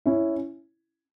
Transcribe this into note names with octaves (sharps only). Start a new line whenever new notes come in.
C#4 E4